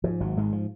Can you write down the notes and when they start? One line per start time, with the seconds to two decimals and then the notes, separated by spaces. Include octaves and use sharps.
0.04 G#2 F3
0.20 G#1 F#3
0.37 G#2 G#3
0.53 F3